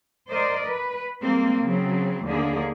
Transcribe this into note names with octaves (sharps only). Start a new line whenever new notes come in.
A#4 C5 D5 D#5
B4
G3 G#3 A#3 C4
C#3 F#3 C4
D#2 D3 A#3 G#4